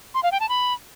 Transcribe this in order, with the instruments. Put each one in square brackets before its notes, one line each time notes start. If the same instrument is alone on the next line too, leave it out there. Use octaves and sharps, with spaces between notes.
[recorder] C6
F5
G5
A5
B5